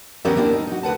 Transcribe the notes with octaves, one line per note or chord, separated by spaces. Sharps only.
D#2 B3 C#4 G4 A#4 E5
A#3 C4 D4 E4
D#4
D#4 F#4
D2 B4 F#5 A5